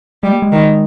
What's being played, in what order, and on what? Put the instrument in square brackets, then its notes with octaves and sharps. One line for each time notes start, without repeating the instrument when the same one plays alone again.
[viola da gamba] G3 [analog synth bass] G#3
[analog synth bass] A#3
G#3
[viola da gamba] D#3